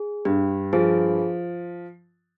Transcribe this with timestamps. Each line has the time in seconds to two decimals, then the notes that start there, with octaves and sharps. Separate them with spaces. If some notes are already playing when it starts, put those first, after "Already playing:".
Already playing: G#4
0.25 G2 G4
0.73 F3 G#4